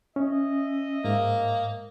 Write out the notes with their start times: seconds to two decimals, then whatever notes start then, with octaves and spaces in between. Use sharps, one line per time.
0.16 C#4 D#5 E5
1.05 G#2 A#3